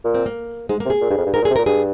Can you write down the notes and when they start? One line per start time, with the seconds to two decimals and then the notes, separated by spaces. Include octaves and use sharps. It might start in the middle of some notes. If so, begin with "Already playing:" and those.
0.04 A#2
0.14 C4
0.26 A#3
0.69 G#2 G#3
0.80 A#3
0.85 C3
0.90 G#4
1.01 A#2
1.10 G2
1.17 F2
1.26 G2
1.34 G#2 A#4
1.42 A#2
1.45 C3 G#4
1.56 A#2 A#4
1.66 G2 G#4